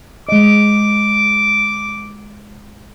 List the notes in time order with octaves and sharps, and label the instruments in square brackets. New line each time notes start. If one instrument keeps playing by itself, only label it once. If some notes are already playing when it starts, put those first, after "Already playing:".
[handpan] G#3 D#5 [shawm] D6